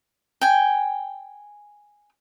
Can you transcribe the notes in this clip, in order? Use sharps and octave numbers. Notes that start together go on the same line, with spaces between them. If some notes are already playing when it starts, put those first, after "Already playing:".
G5 G#5